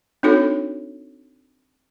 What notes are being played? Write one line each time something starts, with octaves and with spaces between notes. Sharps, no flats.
C4 D4 D#4 F#4 A4 C#5